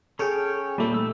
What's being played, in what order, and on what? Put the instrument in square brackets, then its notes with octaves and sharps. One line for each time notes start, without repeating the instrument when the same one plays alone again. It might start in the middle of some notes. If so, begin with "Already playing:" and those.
[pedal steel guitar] C#4 C#5 G5 [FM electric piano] G#4 A4
[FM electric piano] A#2 A3 [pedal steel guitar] G3 A#3 C4
[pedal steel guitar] E3 D#4 E6